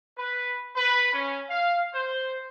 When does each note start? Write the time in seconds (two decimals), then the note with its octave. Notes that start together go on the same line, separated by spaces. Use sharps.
0.18 B4
0.76 B4
1.13 C#4
1.50 F5
1.94 C5